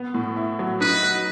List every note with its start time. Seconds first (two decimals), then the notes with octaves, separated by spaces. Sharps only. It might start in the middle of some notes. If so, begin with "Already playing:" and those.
Already playing: B3
0.14 A2
0.37 E4
0.59 F#3
0.81 D#4 B4
1.03 F#3